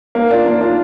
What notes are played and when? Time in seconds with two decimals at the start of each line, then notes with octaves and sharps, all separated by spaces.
0.15 A#3
0.31 D4 F4
0.46 A#3
0.61 D4 F4